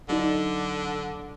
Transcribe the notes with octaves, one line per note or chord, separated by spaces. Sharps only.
D3 F#3 D4 D#4